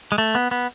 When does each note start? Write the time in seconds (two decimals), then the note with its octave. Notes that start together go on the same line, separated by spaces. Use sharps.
0.12 G#3
0.18 A3
0.35 B3
0.51 B3